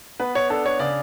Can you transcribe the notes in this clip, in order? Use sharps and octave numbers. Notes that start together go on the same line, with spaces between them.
B3 B4
C#5
D4 A4
C#5
C#3 D5